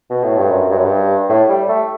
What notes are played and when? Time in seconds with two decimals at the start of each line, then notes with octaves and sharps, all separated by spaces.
0.10 B2
0.24 A2
0.38 G2
0.51 F#2
0.71 G2
0.78 F#2
0.85 G2
1.29 A2
1.49 G3
1.69 A3